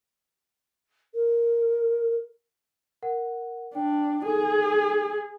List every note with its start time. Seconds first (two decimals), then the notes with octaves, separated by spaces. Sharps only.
1.14 A#4
3.03 A#4 F#5
3.75 D4 G5
4.25 D#4 G#4 A4